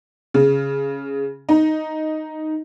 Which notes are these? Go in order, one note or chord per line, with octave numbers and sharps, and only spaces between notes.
C#3
D#4